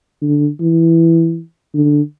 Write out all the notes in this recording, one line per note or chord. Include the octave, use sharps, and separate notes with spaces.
D3
E3
D3